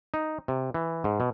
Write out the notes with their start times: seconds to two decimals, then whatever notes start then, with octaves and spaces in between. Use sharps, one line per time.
0.14 D#4
0.48 C3
0.74 E3
1.04 G#2
1.20 B2